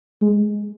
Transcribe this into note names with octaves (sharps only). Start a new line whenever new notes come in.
G#3